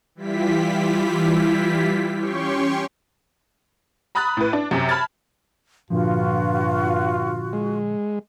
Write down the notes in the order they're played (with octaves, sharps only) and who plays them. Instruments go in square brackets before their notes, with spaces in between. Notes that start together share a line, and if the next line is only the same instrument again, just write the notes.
[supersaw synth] E3 G3 E4 F4 G4 B6
C#4 G4 C#5 G5 C6 C#6
[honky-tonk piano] A#5 B5 D#6 F#6 A6
A2 B4
D4
F#2 C3
A5 B5 F6 G#6 A6
[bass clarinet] G2 [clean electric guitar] A#2 D3 F3 [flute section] F4 F#4
[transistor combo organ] G#3